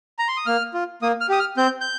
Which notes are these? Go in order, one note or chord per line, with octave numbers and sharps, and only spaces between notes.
A#5
C6
D#6
A#3 F6
F4
A#3 D#6
F6
G4 D#6
F6
C4 G6
G6